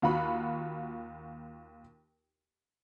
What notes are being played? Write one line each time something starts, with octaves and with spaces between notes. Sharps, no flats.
D#2 F4 F#4 B5